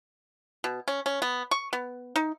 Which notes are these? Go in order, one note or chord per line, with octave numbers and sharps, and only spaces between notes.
B2
C#4
C#4
B3
C#6
B3
D#4